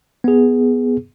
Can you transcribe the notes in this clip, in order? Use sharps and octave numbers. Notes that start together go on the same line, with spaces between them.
B3 G#4